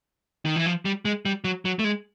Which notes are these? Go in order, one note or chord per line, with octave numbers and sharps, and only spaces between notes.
D#3
E3
F3
G3
G#3
G3
F#3
F#3
A3
G#3